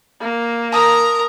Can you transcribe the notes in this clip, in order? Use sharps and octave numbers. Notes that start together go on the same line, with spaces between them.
A#3
A#4 A5 A#5 D#6